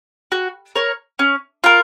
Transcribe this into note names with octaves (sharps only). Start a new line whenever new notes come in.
F#4
A#4 C#5
C#4
F4 A#4